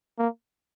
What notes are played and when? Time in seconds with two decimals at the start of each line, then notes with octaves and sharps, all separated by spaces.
0.18 A#3